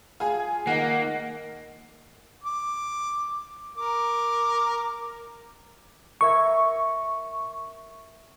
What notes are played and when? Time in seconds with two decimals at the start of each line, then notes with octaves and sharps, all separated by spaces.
0.20 F4 G#4 G#5
0.67 D#3 A#3 F#5
2.44 D6
3.78 A#4 D6
6.21 A#4 E5 C#6 G#6